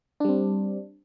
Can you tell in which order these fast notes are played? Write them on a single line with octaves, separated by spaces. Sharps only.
D4 G3 C4